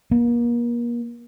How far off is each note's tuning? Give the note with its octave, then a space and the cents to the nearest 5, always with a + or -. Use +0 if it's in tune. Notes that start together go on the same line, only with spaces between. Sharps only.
A#3 +35